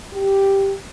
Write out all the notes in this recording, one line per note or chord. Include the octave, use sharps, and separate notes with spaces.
G4